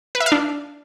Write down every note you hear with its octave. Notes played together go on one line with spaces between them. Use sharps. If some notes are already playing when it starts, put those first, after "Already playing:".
B4
E5
F5
D4